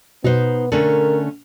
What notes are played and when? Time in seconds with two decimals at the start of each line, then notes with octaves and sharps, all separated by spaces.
0.24 B2 B3 D#4 B4 C5
0.72 D3 A3 C#4 A#4